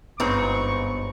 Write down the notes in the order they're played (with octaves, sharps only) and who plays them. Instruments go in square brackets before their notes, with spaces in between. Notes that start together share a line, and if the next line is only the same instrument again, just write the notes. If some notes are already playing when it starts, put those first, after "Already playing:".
[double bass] G1 [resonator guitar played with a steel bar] G#2 C4 D#4 [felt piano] B3 C#5 A#5 [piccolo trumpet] C#6